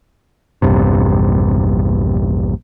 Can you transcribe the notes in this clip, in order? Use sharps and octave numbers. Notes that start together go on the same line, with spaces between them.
A#1 E2 G2 C3